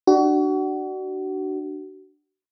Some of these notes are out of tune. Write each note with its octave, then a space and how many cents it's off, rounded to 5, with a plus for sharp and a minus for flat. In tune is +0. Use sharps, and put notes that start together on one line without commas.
D4 +20 F#4 +30